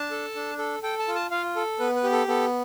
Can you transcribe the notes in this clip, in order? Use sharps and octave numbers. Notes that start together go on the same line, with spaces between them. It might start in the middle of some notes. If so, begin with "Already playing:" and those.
Already playing: D4 A5
A4
D4
A4
A4 G5
A5
F4
A5
F4 F5
A4
B3 B4
B4
G4
A4
B3 A4